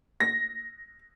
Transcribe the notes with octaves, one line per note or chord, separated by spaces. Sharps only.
A#6